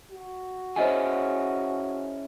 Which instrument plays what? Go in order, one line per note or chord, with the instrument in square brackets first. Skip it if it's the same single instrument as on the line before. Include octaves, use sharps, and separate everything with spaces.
[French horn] F#4
[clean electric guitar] C#4 E4 G#4 [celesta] C5 D#5 G#5